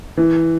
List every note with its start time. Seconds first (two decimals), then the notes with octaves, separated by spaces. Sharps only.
0.17 E3